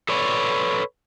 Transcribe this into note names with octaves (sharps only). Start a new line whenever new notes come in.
A4 B4 C#5 D5